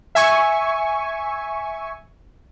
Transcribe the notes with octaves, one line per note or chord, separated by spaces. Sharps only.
E5 G#5 C#6